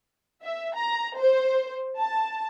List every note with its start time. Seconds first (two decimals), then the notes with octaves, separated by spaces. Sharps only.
0.43 E5
0.75 A#5
1.17 C5
1.98 A5